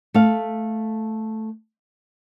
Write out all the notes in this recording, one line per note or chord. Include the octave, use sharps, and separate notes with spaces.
A3 F5